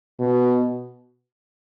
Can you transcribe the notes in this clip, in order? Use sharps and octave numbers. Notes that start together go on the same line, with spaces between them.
B2